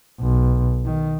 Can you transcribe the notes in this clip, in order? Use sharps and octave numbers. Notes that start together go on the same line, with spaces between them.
B1
D#3